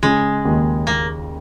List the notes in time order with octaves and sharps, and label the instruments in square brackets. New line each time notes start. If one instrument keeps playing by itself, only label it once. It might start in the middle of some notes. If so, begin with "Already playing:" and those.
[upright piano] C#3 [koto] G#3
[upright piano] D#2
[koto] A#3